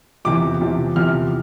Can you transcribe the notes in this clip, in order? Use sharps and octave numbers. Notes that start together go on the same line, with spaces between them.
E2 C3 F3 D6
E2 C3 F3
E2 C3 F3 F6